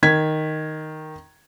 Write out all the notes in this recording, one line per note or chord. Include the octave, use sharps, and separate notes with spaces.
D#3 G#6 B6